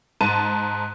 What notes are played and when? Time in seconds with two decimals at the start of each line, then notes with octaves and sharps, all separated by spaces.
0.21 G#2 A5 D#7